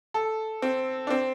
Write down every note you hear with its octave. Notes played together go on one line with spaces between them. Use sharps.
A4
C4
D4
C4